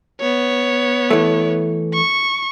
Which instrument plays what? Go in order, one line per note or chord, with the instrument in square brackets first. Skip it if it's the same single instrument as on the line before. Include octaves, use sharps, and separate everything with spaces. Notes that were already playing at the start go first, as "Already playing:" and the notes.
[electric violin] B3 C#5
[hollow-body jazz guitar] E3 A3
[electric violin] C#6